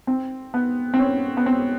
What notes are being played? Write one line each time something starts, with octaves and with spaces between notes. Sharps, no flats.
C4
B3
C4
C#4
B3
C4